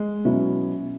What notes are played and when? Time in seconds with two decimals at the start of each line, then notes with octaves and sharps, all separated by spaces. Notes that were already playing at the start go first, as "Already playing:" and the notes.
Already playing: G#3
0.25 B2 F#3 C#4 E4